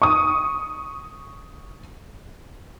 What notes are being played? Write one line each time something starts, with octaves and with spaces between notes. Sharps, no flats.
C#6 D#6